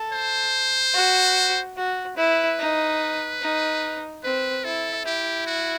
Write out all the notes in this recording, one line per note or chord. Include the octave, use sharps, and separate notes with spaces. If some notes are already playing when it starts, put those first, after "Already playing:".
Already playing: A4
C5
F#4
F#4
E4 B4
D#4
D#4
C4 B4
E4 A4
E4 G4
F#4